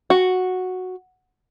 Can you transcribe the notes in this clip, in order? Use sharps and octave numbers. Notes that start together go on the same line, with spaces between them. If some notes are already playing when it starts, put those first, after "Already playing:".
F#4